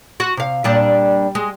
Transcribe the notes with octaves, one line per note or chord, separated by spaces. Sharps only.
F#4
C3 F5
A#2 G3 D4
G#3